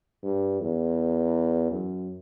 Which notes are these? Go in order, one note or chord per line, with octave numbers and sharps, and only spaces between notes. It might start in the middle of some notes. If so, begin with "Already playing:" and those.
G2
E2
F#2